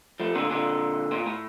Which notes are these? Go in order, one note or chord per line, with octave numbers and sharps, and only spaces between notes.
F3 A3
A#2 D3
A#2 D3
A#2
A2